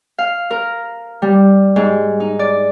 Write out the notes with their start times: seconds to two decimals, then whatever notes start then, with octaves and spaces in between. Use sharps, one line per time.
0.18 F5
0.51 A#4
1.22 G3
1.76 G#2
2.20 D#4
2.39 D5